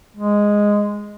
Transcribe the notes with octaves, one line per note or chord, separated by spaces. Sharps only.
G#3